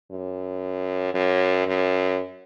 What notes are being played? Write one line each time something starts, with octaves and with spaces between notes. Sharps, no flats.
F#2
F#2
F#2